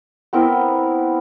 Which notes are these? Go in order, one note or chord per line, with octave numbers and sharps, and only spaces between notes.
B3 C4 E4 A#4